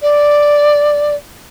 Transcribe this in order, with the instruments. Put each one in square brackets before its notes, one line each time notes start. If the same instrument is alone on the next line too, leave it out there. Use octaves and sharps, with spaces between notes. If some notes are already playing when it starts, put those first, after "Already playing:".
[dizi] D5